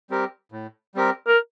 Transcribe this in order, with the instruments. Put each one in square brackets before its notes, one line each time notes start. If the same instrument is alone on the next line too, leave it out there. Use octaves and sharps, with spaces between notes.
[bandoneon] G3 C4 G4 A#4
A2
G3 C4 G4 A#4
[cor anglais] A#4